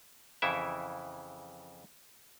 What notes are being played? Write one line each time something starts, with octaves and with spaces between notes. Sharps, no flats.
F2 C#3 E3 E4 E5